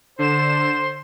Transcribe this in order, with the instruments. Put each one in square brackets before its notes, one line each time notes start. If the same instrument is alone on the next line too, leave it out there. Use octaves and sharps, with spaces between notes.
[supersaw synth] D3 E7 [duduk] C5